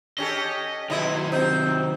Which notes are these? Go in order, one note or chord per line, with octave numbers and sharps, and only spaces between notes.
C#4 G4 A4 D#5
B2 D#3 F#3 E4 D#5
C3 C4 D#4